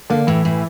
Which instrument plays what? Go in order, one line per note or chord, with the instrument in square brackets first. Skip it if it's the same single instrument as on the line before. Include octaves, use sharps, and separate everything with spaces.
[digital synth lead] D3 [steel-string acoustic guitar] A#3
[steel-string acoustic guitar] A2 [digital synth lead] E3
[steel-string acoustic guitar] A2